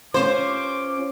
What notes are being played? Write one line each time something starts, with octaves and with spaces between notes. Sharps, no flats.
C#4 F4 C5 D6